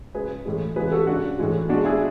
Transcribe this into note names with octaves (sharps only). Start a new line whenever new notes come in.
C#3 G#3 G#4 B4
A2 E3 G#3
C#3 E3 G#3 G#4 B4
F#4 A4
C#3 G#3 D4 F#4
A2 E3 G#3
B2 G#3 D4 F#4
E4 G#4